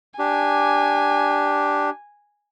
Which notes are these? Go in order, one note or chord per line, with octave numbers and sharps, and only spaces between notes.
D4 G4 G#5